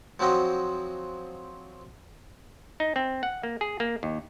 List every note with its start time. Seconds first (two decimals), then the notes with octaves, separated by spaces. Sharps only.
0.20 F3 F#3 C4 F#4 D#5
2.80 D#4
2.96 C4
3.23 F#5
3.43 A#3
3.61 G#4
3.80 A#3
4.03 D#2